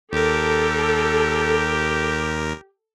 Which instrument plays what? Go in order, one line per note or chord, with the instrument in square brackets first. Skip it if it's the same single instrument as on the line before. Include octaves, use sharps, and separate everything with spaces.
[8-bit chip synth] D#2 A#4 [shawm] G4 [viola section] A4